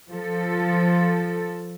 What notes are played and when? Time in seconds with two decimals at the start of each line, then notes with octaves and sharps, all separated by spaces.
0.10 F3 A4